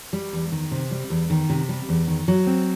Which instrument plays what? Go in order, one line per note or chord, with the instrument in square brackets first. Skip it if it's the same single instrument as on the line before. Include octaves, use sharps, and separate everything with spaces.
[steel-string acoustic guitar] G3
E2
D#3
C3
G3
E2
D#3
C3
G3
E2
D#3
F#3
C4